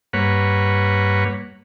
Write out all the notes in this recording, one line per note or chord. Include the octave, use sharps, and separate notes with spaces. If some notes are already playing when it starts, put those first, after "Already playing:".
G2 A#3 B4 C#5 F#5